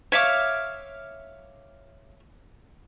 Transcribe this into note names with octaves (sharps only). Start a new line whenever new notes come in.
C#5 E5 F5 D6